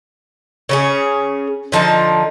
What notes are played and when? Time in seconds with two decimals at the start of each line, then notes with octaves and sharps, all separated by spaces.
0.69 C#3 C#4 G#4
1.72 D3 F3 D#4 A5